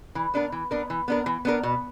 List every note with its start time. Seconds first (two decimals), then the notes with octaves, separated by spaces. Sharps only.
0.15 E3
0.34 B3 D4 A#4
0.52 E3
0.71 B3 D4 A#4
0.90 E3
1.08 B3 D4 A#4
1.26 E3
1.45 B3 D4 A#4
1.63 B2